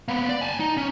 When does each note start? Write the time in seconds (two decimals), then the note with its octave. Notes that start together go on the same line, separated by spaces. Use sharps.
0.08 A#3 B3
0.29 D5
0.41 G#5 A5
0.60 D#4
0.77 C#4